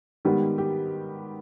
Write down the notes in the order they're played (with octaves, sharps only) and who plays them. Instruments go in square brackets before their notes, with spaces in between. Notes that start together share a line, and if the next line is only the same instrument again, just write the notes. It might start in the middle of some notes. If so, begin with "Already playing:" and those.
[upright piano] G#2 D#3 G3 B3 D#4 G4
G4